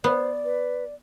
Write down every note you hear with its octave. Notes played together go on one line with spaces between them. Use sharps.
B3 C5 D5
B4